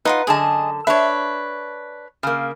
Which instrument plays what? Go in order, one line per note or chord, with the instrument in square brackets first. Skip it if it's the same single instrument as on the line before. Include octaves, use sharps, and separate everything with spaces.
[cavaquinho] D#4 F4 F#5 [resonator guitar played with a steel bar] B4
[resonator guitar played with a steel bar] F#2 D3 A5 [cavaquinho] G#4 D#5
[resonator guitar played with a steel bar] D4 E5 [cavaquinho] B4 C#5
[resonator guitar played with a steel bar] C#3 A#3